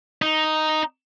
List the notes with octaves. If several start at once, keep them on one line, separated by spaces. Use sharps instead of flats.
D#4